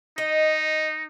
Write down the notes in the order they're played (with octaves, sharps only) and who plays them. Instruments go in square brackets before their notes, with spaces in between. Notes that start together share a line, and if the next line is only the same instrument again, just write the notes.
[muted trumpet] D#4 [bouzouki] D#5